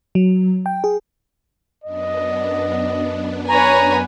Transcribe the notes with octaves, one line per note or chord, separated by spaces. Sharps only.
F#3
G5
G#4
F#2 B3 D4 D#5
B4 C#5 G#5 A#5